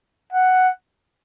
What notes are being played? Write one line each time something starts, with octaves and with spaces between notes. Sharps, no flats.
F#5